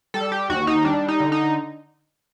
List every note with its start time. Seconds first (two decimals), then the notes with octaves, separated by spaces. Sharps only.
0.14 G3 A4
0.32 G4
0.49 D#2 F#4
0.67 D#4
0.84 G3 D4
1.08 D#4
1.20 D3
1.32 D#4